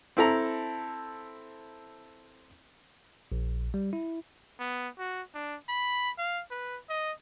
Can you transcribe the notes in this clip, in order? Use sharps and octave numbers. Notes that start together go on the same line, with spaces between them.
C4 E4 A4 A#5
A#1
G3
E4
B3
F#4
D4
B5
F5
B4
D#5